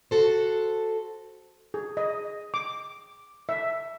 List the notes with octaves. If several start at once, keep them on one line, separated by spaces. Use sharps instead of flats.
F#4 A4 C5
G#4
D#5
D6
E5